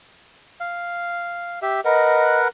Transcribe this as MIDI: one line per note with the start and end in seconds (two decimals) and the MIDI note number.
0.60 1.59 77
1.62 1.81 67
1.62 1.81 76
1.85 2.48 70
1.85 2.48 71
1.85 2.39 75
1.85 2.48 78